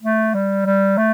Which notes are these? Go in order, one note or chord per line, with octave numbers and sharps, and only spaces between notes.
A3
G3
G3
A3